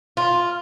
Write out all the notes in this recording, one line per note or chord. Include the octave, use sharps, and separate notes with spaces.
F4